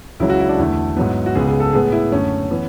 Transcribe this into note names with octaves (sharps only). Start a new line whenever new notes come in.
C#2 C#3 F#3 E4
F#4
E4
D4
E2 D3 A3 E4
G#2 F#3 B3
F#4
C#2 C#3 G#3 B3 G#4
G#4
A4
A2 G#3 B3 G#4
E4
F#2 D3 A3 C#4
E3 B3